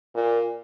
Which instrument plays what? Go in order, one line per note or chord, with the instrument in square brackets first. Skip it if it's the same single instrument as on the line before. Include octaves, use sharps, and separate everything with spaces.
[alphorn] A#2